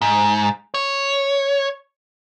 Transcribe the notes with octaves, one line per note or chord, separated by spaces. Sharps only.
G#2
C#5